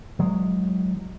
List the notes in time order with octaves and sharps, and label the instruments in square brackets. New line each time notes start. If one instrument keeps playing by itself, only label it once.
[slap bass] E3 F#3 G#3